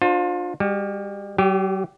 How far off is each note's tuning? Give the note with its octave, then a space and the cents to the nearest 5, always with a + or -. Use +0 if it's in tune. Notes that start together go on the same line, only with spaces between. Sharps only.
D4 +25 F4 +30 C5 +0
G3 +40 G4 -35
F#3 +45 G4 +0